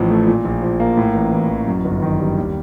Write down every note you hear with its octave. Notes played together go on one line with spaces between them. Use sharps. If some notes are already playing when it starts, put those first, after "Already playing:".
Already playing: A1 A2 F3
A3
A#2
A#1
F3
A#3
A2
A1
E3
A1
F#2
G1
D#3
G3
D#2